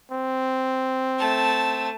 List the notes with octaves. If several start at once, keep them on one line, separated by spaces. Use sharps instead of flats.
C4
A3 A5